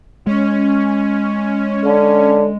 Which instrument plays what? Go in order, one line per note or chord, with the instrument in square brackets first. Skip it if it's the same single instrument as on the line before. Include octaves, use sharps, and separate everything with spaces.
[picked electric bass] G#3 [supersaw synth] C#4
[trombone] D3